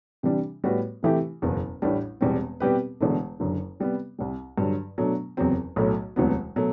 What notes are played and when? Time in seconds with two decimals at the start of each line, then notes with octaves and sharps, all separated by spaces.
0.23 C3 E3 G3 D4
0.64 A2 G3 B3 F#4 B4
1.03 C3 E3 A3 E4 G4
1.42 F#1 E2 B2
1.82 A1 A2 G3 D4
2.21 E1 E2 B2 G3 C4
2.60 B2 G3 C4 G4 B4
3.01 E1 E2 D3 A3 D4
3.40 F#1 F#2 D3
3.80 C3 G3 B3
4.19 C2 C3 G3
4.58 G2 D3 F#3
4.98 B2 F#3 A3 D4
5.37 F#1 E2 C3 F#3 C4
5.76 B1 A2 F#3 A3
6.16 E1 D2 C3 F#3 B3
6.56 B2 F#3 A3